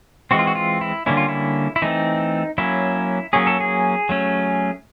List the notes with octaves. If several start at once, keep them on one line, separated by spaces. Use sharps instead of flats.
E3 G#3 C4 F#4
F4
F#4
F4
E4
D3 G3 A#3 C#4 E4
F4
E4
E4
E3 A3 C4 D#4
F#3 A#3 C#4 E4
F#3 A#3 C#4 G#4
A4
G#4
F#3 A3 C#4